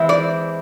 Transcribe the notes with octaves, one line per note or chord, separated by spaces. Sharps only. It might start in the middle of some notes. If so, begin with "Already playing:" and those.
Already playing: E3 G#3 C4 E4
D5